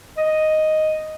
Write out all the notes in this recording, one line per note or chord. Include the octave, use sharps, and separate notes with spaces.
D#5